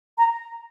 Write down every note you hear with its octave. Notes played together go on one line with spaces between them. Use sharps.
A#5